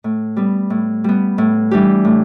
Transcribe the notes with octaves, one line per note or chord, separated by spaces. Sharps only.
A2
G3 B3
A2
G3 B3
A2
E3 G3 D4 G4
A2